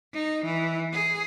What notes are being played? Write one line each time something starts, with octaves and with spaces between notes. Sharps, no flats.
D#4
E3
G#4